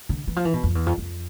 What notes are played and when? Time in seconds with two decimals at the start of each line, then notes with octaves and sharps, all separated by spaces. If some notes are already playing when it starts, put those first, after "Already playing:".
0.09 D3
0.28 E3
0.36 F3
0.45 E3
0.54 B2
0.63 F2
0.75 E2
0.86 F2
0.98 F2